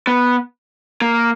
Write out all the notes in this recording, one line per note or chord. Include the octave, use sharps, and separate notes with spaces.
B3
A#3